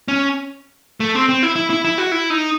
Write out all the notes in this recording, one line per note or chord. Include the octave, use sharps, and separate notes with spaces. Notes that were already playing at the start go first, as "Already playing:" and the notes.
C#4
A3
C4
C4
E4
E4
E4
E4
F#4
E4
D#4